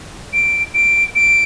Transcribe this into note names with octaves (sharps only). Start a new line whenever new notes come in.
D7
D7
D7